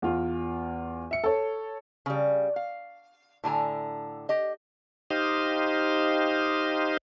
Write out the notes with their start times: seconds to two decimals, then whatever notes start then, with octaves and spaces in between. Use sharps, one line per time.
0.02 E2 F4
1.11 E5 C#7
1.24 A4 C#5
2.06 C#3 G3
2.56 F5
3.44 A2 D3 G#5 A#5
4.29 G4 D#5
5.10 D#4 G4 C5 D#5 F5